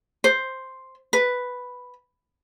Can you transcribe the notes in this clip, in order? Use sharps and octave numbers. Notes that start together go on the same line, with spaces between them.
C5
B4